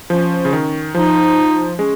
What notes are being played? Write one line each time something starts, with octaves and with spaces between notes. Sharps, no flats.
F3 C#4
C#3
D#3
F3 D#4
G#3 C#4